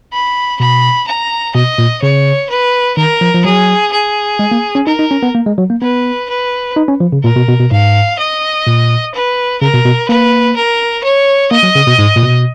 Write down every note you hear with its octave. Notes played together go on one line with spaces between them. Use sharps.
B5
B2 B5
A#5
B2 D#5
A#2
C#3 C#5
B4
D#3 A#4
F3
F3
F#3 G#4
G#4
G#3
A#3
C#4
D#4 A#4
D#4
C#4
B3
A#3
G#3
F#3
A#3
B3 B4
B4
D#4
C#4
F3
C#3
A#2 A#4
B2
B2
B2
G#2 F5
D#5
A#2
B4
C#3 A#4
B2
B2
A#3 B4
A#4
C#5
A#3 D#5
F#3
C#3
B2
G#2
A#2
B2